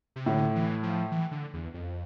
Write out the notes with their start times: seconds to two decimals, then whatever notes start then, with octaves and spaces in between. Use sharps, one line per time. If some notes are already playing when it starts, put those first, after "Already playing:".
0.16 C3
0.26 A2 D3
0.55 E3
0.83 F3
1.11 E3
1.31 D3
1.54 E2
1.74 F2